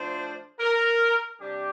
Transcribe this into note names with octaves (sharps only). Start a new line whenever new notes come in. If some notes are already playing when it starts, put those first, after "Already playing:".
Already playing: A2 F3 A3 D4 C5
A#4
C3 G3 D4 G4